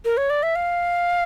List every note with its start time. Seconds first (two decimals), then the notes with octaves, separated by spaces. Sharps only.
0.05 A#4
0.17 C#5
0.30 D5
0.43 E5
0.56 F5